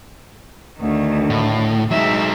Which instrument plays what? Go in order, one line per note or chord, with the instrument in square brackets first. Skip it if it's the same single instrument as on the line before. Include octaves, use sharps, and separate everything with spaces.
[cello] D2 D#3
[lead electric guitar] A2
[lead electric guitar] F#3 D#4 [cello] G#3 E5